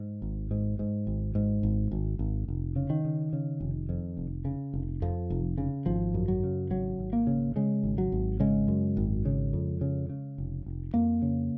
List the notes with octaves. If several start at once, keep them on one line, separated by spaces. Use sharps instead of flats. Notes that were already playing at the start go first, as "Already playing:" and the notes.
Already playing: G#2
G#1
G#2
G#2
G#1
G#2
G#1
G#1
G#1
F1
C#3
D#3
C#3
C#3
F1
F2
F1
C#3
F1
F2 F3
F1
C#3
G#1 F3
F#2
F#3
C#3
G#1 F#3
G#1
A#3
C#3
C#3 G#3
G#1
F#3
G#1
C#3 G#3
F#2
G#1
C#3
F2
C#3
C#3
F1
F1
F2 A#3
C#3